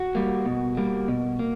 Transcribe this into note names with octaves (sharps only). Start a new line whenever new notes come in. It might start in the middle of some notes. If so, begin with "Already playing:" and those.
Already playing: F#4
G3 A#3
B2
G3 A#3
B2
A#3